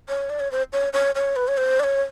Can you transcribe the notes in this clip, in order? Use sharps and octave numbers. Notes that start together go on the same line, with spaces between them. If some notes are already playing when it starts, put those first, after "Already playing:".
C#5
D5
C#5
C5
C#5
C#5
C#5
B4
C#5
C5
D5
C#5